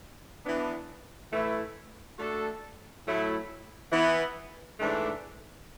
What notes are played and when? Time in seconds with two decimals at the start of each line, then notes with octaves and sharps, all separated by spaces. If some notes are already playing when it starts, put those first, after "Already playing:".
0.43 E3 B3 D4
1.31 A2 E3 A3 E4 B4
2.18 A3 D4 F#4 A4
3.06 A2 F#3 A3 E4
3.92 E3 B3 E4
4.80 G#2 E3 A3 D4